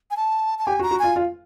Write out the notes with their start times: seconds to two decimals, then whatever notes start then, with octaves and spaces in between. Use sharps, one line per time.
0.11 G#5
0.17 A5
0.59 A5
0.66 G4 G#5
0.79 F#4
0.83 A#5
0.91 F#4
0.99 F4 G#5
1.16 F4